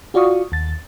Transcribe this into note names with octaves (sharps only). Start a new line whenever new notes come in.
F4 F#4 D5 F5 C#6 D#6
D#2 A6